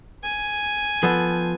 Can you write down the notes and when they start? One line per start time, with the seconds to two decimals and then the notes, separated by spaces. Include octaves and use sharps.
0.23 G#5
1.03 F3 B3 A4 G5